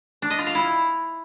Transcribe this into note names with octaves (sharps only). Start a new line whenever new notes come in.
D4
D#5
F4
F5
E4